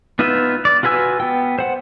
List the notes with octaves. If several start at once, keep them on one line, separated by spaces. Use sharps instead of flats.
B3 D#4 F4 B4 E5
D5
F4 F#4 B4 G#5 E6
B3 G5
C5 F#5